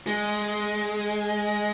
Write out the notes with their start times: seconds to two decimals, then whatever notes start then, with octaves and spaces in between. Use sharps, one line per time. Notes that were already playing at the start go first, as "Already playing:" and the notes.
0.07 G#3